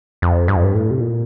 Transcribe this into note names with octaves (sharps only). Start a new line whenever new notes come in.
F2
G2
F2
G2
A2
C3
A#2